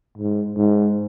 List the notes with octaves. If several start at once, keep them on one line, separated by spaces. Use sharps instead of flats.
G#2
G#2